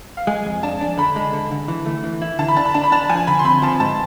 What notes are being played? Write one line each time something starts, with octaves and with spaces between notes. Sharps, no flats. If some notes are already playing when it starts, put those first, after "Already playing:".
F5
G#3 G#5
F2
D4 A5
D4
D3 B5
G#3
D3
D3
E3
A3
E3
E4
D3 A5
B5
D4 A5
B5
D4 A5
B5
D4 A5
F3 G#5
D3 B5
C6
C4 B5
F3 A5
G#2 A5